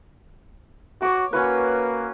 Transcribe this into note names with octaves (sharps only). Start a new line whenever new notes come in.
F#4 C#5 D6
A#3 C#4 F#4 B4